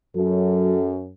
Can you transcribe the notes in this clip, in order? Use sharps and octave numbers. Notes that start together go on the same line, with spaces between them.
F#2 F#3 A4